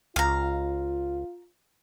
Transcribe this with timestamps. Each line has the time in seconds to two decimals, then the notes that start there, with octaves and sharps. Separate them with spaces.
0.16 C#2 F4 F5 A#5